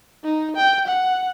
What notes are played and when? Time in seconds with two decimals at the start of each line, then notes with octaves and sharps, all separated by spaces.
0.24 D#4
0.56 G5
0.87 F#5